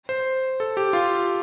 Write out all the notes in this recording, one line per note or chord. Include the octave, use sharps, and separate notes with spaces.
C5
A4
G4
F4